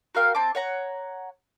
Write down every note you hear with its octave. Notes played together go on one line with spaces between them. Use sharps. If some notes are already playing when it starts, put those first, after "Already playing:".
F#4 A#4 F5 G5
C4 A5 D6
C#5 F#5 A#5